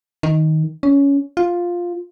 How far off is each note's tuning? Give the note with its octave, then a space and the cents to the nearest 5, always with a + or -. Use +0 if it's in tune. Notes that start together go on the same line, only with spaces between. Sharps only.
D#3 +10
C#4 +15
F4 +5